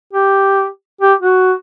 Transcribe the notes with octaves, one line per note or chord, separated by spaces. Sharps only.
G4
G4
F#4